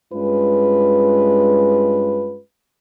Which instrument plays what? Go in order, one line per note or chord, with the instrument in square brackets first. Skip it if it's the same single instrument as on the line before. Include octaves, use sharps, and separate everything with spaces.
[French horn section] G2 G#3 C#4 F4 B4